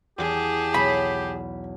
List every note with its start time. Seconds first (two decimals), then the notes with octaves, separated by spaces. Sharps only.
0.18 E2 G4 G#4 A5
0.74 B1 B5